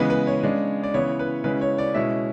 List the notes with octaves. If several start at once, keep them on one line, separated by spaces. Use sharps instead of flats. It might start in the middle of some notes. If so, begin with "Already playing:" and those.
Already playing: C#3 E3 G#3 B3 B4
B4
C#5
C#3 G#3 D4
D5
C#3 E3 B3 E4 C#5
B4
C#3 G#3 C#4 E4 B4
C#5
D5
B2 G#3 C#4 E4 E5